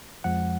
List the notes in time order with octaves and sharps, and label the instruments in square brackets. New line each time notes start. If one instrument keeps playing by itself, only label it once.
[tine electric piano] F2 F3 G#3 F#5